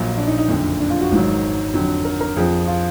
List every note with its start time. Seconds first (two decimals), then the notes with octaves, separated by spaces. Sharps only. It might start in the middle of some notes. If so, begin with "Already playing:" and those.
Already playing: A#1 A#2 F#3
0.18 D4
0.27 D#4
0.38 D#4
0.48 F#1 F2 D3
0.80 D4
0.90 F4
1.01 F#4
1.11 G#1 G#2 D#3 F#3
1.74 F2 D3 F#3
2.05 A#4
2.21 A#4
2.37 F2 F3 G#4
2.67 F4